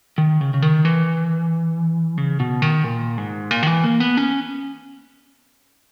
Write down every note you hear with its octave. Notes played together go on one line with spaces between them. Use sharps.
D#3
C#3
C#3
D#3
E3
C#3
B2
D#3
A#2
G#2
A#2
D#3
E3
A#3
B3
C#4